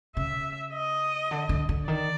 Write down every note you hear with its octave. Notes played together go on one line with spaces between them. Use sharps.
C#3 E5
D#5
D3
D3
D3
D#3 D5